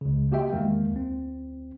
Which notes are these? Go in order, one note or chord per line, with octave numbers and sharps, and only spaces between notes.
C#2 C#3
A#3 F#4 G4 D#5 E5 G5
E2 D#3 G#3 A#3
D2 C4